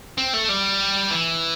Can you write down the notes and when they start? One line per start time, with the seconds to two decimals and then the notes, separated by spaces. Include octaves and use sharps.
0.18 C4
0.34 A3
0.49 G3
1.10 E3